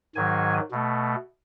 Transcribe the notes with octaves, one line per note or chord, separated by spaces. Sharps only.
G#2 D#3 F#3 G#5
B2 A3